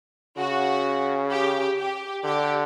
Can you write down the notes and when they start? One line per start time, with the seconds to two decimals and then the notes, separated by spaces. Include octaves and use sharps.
0.37 C#3 F#4
1.31 G4
1.78 G4
2.24 D3 G4